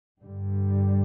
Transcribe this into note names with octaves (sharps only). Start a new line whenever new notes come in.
G2 D3 G3